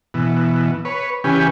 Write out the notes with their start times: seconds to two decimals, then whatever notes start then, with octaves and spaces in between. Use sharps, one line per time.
0.14 B2 E3
0.85 B4 C#5
1.24 C#3 E3 C#4 G4 B4 G#5